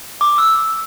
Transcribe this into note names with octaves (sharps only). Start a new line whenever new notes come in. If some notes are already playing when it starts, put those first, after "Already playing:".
D6
E6